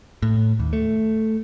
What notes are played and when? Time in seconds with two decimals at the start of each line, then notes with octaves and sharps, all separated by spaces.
0.23 A2
0.59 D#2
0.73 A3